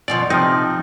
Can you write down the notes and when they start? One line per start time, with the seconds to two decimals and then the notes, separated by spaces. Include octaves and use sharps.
0.08 F#2 B2 F3 D5
0.30 C3 F3 D#4